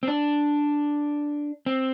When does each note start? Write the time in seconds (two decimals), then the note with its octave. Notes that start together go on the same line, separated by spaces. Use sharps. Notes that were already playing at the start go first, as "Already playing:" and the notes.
0.03 C4
0.07 D4
1.66 C4